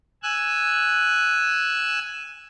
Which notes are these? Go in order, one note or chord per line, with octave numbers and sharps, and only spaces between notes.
G#5 E6 F#6